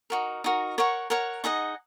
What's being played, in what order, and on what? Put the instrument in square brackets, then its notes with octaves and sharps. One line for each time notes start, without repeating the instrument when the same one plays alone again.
[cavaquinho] D#4 F#4 A#4
D#4 F#4 A#4
A#4 C#5 F#5 C#6
A#4 C#5 F#5 C#6
D#4 G#4 D#5 F#5